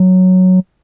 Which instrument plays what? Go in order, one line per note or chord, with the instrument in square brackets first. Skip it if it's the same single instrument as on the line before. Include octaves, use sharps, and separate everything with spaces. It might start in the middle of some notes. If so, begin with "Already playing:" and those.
Already playing: [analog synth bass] F#3